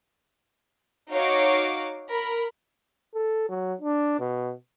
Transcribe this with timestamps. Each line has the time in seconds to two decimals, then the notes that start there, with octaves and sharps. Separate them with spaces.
1.12 D#4 F#4 C#5 F5 D6
2.10 A#4 B5
3.15 A4
3.49 F#3
3.81 D4
4.20 B2